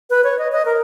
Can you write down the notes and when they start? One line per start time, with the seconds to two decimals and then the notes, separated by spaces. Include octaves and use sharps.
0.10 B4
0.24 C#5
0.39 D#5
0.52 D#5
0.65 A#4